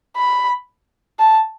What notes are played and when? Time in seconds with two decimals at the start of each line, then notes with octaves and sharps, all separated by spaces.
0.16 B5
1.19 A5